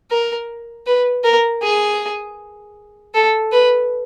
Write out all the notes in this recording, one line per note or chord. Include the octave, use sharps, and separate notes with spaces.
A#4
B4
A#4
G#4
A4
B4